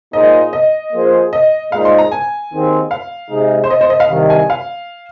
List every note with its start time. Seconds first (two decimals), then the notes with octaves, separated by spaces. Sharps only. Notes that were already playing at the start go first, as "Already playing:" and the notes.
0.13 A#2 A#3 D#4 G#4 C5 D#5
0.53 D#5
0.93 F3 A#3 G#4 C5
1.33 D#5
1.72 A#2 G#3 D#4 C5 F5
1.85 C6
1.98 A#5
2.12 G#5
2.51 D#2 D#3 C4 G#4
2.91 F5
3.30 C3 G#3 D#4 G#4
3.64 C5
3.70 D#5
3.81 C5
3.90 D#5
4.00 F5
4.10 C2 C3 D#3
4.30 G#5
4.50 F5